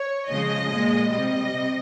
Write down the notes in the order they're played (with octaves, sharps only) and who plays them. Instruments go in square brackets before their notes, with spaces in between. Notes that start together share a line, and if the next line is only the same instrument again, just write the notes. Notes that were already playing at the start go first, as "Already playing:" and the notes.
Already playing: [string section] C#5
C#3 F3 G#3 D#5
A#2 G#3
C3 G3 D#5
C3